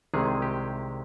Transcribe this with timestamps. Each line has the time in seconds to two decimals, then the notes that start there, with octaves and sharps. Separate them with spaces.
0.14 C2 C3 D#3 G#3 G#4
0.42 G4